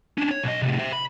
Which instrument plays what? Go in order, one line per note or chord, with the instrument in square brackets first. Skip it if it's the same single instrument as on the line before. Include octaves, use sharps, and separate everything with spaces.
[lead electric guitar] C#4 D4
C#5
B1 D#5
A2 C3
C5 E5
B5